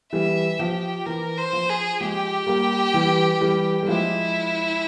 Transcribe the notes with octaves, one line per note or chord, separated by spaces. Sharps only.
E3 G3 E5
F3 G4
E3 A#4
C5
F3
G#4
F3 G#3 G4
G3 A#3
E3 G3
E3 G3
G3
F3 G#3 E4